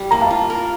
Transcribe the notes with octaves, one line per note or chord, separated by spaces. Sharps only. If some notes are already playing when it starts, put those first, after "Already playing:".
Already playing: G3
A#3 A#5
F5 A5
F4
A#4